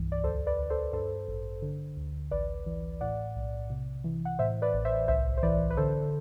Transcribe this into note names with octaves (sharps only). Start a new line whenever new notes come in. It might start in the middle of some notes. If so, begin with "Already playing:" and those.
Already playing: C2 G2 E3
D5
D2 A4 C5
B4 D5
D2
A4 C5
G2 A4 C5
A1
D3
D2
A1 B4 D5
E3
A2 D5 F#5
B1
C3
E3
F#5
A2 C5 E5
B4 D5
A1
C5 E5
C2 C5 E5
C5
E3 B4 D5
B4
D3 A4 C5